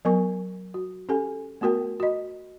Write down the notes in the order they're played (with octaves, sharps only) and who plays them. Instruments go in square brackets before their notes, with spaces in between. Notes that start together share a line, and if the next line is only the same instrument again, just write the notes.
[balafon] F#3 B3 A#4 G#5 C#6
F#4
C#4 G4 A4 G#5
A3 B3 F#4 A#4 G5
F#4 D#5